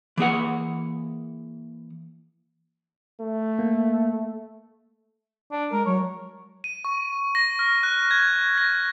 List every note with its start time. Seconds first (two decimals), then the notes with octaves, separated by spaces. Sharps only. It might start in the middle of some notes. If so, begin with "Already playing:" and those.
0.17 E3 A#3 G#4 F#5
3.20 A3
3.59 A#3
5.52 D4
5.72 G#3 A#4
5.86 F#3 C#5
6.64 D#7
6.85 C#6
7.35 A#6
7.59 F6
7.83 F#6
8.11 G#6
8.58 A#6